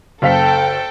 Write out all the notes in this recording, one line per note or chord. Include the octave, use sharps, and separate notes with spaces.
F#1 A4 F5 G5 B6